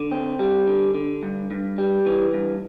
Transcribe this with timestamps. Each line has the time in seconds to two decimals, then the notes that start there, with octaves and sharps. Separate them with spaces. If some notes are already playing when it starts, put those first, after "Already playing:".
Already playing: D3
0.11 C4
0.39 G3
0.67 D3
0.95 D3
1.23 G2
1.51 G2
1.78 G3
2.06 E3
2.33 G2